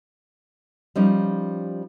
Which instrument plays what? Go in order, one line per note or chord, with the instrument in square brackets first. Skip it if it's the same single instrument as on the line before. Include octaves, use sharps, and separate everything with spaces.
[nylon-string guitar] F3 G3 C#4 D#4